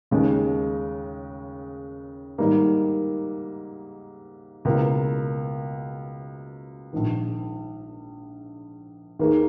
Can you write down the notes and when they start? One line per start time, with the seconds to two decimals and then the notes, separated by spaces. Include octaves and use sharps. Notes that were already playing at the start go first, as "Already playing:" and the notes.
0.11 D#2 C#3 G#3
2.38 G#2 D#3 G3 A#3 D#4
4.65 C#2 B2 A#3 E4 A#4
6.93 A#1 G#2 D#3
9.19 D#2 D#3 A#3 D#4 G#4